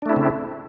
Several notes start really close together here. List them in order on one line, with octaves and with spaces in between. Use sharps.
D4 A3 E4 C4 C#3